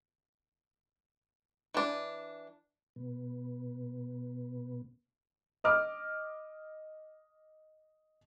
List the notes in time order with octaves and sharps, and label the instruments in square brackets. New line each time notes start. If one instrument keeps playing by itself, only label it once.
[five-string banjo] E3 D4
[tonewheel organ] B2 B3
[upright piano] D#5 D6 F6